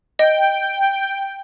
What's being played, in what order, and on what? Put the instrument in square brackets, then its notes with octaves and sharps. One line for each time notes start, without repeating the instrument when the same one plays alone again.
[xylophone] D#5 [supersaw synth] G5